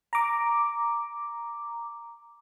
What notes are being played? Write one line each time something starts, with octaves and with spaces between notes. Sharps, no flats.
A#5 D6